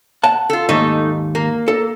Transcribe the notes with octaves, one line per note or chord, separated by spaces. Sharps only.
F#5 A5
F4 A4
D#2 G#2 A3 D#4
A#3
A4